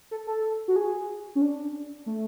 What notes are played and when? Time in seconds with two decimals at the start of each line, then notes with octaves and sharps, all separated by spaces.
0.11 A4
0.27 A4
0.68 F#4
0.76 G#4
1.35 C#4
1.42 D4
2.06 A3